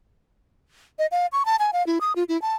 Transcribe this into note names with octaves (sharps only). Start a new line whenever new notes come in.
D#5
F5
C#6
A5
G#5
F5
E4
D#6
F4
E4
A5